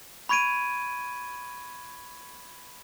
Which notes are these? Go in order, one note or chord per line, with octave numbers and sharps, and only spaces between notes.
B5 C#6 G#6 D7 D#7